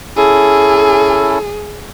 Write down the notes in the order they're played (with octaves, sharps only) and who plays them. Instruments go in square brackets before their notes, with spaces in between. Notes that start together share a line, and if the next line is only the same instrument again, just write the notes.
[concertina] C#4 E4 A4 [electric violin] G#4